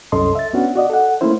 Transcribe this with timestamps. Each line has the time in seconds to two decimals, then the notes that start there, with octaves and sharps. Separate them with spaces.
0.12 C2 F#2 C#4 A4 D#5 C6
0.35 E5 A6
0.53 B3 C#4 D4 F#4
0.75 F#4 D5 D#5
0.89 A4 F#5
1.21 A3 A#3 C#4 E4 C5